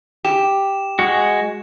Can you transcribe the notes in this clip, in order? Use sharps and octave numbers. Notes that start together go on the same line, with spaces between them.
G4 E7
G#3 F#4